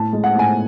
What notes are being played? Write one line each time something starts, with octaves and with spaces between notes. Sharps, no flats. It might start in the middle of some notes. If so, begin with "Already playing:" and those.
Already playing: A2 A5
G#3
F#5
A2 G#5